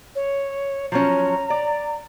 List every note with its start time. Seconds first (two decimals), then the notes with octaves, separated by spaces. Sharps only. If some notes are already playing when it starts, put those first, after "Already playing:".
0.16 C#5
0.92 F3 F#3 C#4 A#5
1.50 D5